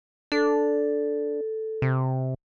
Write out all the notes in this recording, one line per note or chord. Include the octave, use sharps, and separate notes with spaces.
D4 A4
C3